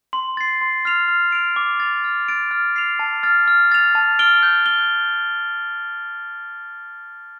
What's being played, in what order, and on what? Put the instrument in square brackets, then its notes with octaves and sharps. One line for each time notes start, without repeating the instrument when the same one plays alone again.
[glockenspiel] C6
A6 C7
C6
F6 C7 F7
F6
D7 F7
D6
A6 F7
F6
A6 D7
F6
C7 F7
A5
F6 A6
F6
A6 F7
A5
F6 D7 G7
G6
G7